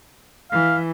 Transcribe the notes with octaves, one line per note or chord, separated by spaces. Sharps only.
E3 F5